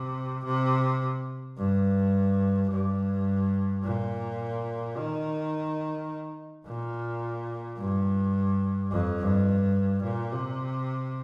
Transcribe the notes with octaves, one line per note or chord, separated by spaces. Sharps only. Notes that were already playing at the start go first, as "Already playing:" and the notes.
Already playing: C3
C3
G2
G2
A#2
D#3
A#2
G2
F2
G2
A#2
C3